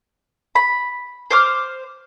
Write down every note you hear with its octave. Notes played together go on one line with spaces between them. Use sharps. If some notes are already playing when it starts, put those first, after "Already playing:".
B5
C5 D6 F6